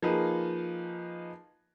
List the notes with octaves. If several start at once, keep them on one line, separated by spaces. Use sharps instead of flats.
F3 A#3 D#4 G#4 B4